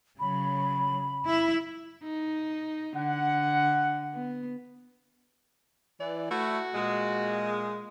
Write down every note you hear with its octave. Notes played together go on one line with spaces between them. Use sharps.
C#3 F#3 B5
E4 E5
D#4
D3 F#5
B3
E3 D5
A3 E4 F#4
A#2 G#3